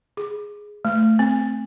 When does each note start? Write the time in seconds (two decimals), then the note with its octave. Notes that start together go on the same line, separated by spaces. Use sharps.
0.17 G#4
0.85 A3
1.19 C4